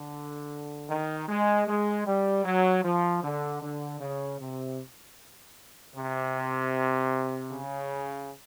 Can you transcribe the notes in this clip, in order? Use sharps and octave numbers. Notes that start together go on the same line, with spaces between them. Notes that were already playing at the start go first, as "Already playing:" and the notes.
Already playing: D3
D#3
G#3
G#3
G3
F#3
F3
D3
D3
C#3
C3
C3
C#3